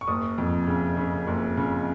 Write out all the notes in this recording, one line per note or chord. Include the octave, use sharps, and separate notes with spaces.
C#6
F#1 D#6
F2
C#3
C#3
F#1
C#3